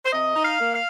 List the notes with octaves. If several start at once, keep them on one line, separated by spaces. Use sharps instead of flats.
C5
C3 D#5
D#4
F5
A#3
F5